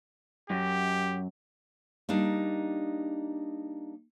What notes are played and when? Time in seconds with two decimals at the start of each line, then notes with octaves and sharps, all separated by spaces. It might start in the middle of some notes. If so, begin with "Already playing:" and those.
0.50 F#2 G4
2.09 G3 A#3 D4 D#4